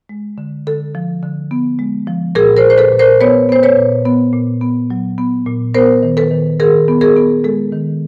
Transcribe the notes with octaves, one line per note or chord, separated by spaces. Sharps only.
G#3
D3
D3 A4
F3
D3
B3
G#3
F3
A#2 G#4 A#4
A#4 C5
A#2
C5
A4 B4
A#2
A#4 C5
B3 B4 C#5
B3 C5
B4 C#5
A#2
B3
A#2
B3
F#3
B3
A#2
B3 A#4 C5
D#3
A4 B4
D#3
D#3 G#4 A#4
B3
G#4 A#4
B3
G#3 A4
D#3